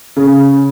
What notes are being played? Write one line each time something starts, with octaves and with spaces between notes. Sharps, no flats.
C#3